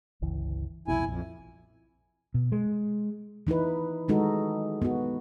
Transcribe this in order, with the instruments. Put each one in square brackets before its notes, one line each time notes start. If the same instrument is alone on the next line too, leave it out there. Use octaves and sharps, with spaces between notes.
[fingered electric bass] G1 C#2 E3
[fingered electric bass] C2 F2 B2 [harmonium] E4 G#5
[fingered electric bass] A#1 [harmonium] F2
[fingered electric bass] B2
G#3
[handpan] E3 D#4 E4 B4
D#3 G#3 D#4 F#4 A4
B3 F#4